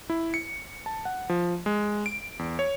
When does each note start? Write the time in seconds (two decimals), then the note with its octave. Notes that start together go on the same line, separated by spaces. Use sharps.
0.10 E4
0.34 C#7
0.86 A5
1.05 F#5
1.29 F3
1.66 G#3
2.06 D7
2.39 E2
2.59 C#5